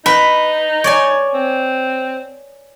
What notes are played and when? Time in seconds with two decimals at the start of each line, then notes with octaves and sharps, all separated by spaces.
0.06 D#4 B4 B5
0.84 C#5 D5 G#5
1.34 C4